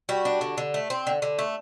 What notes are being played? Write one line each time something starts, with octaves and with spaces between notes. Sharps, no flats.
G3 F#4
D4
D3
D3
A3
C4
D3
D3
A3